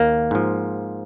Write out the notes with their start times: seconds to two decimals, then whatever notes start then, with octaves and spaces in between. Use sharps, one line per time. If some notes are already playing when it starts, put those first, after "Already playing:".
Already playing: D#2 A#3
0.31 G#2 F3